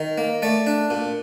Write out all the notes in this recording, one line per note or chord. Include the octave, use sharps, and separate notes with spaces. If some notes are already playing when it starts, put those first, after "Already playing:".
Already playing: D#3
A#3
A3 D5
D4
A#2